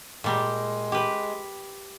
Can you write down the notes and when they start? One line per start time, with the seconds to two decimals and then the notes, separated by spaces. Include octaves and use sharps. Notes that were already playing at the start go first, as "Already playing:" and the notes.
0.24 A#2 G3 G#3 G4
0.92 G4 B4